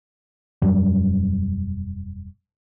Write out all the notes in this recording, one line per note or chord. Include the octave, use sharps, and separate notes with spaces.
E1 F#2 F#3 G3